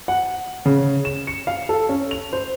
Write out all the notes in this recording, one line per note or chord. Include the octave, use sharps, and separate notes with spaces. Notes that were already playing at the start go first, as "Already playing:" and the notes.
F#5
C#3
E7
C#7
F5
A4
C#4
F7
C5